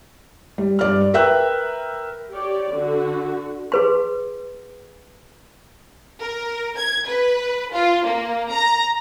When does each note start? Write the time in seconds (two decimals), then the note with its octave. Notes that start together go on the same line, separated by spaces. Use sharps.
0.58 G3
0.79 G2 D5 F6
1.14 A#4 B4 E5 G5 E6 F#6
2.32 G4 C#5 D5
2.71 D3 F#4
3.72 G#4 B4 C6
6.18 A#4
6.77 G#6
7.06 B4
7.72 F4
8.05 A#3
8.50 A#5